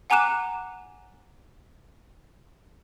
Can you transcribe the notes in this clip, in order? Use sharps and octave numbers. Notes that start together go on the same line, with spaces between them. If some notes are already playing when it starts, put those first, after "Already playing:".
F#5 G#5 A#5 D6 F#6 E7